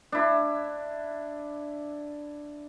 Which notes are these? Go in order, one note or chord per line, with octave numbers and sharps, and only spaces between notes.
D4 E4